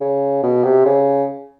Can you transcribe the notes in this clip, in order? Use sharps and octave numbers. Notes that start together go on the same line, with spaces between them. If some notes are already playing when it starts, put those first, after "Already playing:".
C#3
B2
C3
C#3